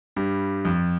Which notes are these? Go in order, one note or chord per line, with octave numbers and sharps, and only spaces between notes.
G2 G3
F2 F3